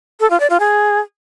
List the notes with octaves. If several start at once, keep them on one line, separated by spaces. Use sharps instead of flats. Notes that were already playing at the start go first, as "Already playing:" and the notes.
A4
F4
D5
F4
G#4